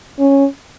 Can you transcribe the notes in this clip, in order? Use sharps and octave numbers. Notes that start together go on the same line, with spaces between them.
C#4